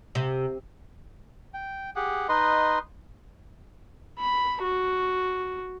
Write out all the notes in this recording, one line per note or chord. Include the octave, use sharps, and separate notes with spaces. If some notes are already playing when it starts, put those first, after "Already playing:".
C3
G5
G4 G#4 F#5
D#4 B4 D#5 C6
B5
F#4